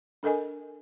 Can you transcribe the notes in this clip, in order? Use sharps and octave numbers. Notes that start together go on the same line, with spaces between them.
D4 A4 A#4 D#5 G#5